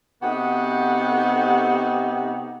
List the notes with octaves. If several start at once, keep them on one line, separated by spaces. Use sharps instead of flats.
C3 B3 D#4 F#4 G4 A4